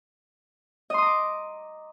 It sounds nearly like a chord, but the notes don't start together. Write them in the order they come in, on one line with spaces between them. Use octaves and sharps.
D#5 C6 D#6 A#5 D6